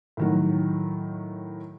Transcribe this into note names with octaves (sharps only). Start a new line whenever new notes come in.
A2 D#3 F#3